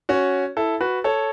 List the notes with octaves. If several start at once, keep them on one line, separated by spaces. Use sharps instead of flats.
C#4 F#4
E4 A4
F#4 B4
A4 C#5